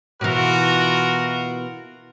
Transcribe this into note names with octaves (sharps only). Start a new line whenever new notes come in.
B2 E3 F4 F#4 A#4